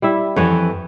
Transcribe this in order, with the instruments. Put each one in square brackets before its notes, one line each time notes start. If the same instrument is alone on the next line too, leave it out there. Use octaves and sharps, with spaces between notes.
[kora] G3 E4 E5
[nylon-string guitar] F2 E3 [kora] B4 C#5 F#5